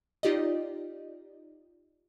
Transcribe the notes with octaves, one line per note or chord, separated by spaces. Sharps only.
D#4 F4 G4 D5 D#5